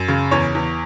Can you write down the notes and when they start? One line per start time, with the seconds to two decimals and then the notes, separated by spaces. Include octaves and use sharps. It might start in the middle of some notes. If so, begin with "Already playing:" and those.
Already playing: F#2
0.08 C#3
0.31 E2 C#5
0.55 E2